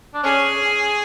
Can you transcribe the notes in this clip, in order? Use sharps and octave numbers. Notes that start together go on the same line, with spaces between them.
D4
C#4 G#4